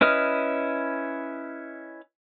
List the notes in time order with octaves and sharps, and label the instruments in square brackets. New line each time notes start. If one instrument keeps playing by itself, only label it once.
[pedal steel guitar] C#4 E4 B4 D#5 F6